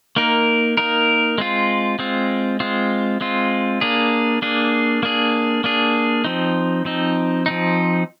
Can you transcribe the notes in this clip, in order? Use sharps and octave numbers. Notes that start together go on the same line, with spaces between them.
A#3 D#4 A#4
A#3 D#4 A#4
G#3 C4 F4
G#3 C4 F4
G#3 C4 F4
G#3 C4 F4
A#3 D4 G#4
A#3 D4 G#4
A#3 D4 G#4
A#3 D4 G#4
F3 C4 D#4
F3 C4 D#4
F3 C4 D#4